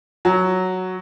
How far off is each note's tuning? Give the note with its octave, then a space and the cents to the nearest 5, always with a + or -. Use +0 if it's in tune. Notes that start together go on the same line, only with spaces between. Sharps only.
F#3 +0